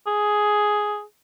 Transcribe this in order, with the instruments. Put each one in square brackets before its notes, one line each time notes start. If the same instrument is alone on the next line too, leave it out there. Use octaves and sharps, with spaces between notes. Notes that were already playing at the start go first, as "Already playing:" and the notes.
[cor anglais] G#4